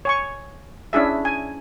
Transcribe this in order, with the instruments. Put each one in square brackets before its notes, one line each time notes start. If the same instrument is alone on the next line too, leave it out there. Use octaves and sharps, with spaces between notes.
[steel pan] C#5 G#5 C#6
C#4 D4 E4 G#4 E5
G#5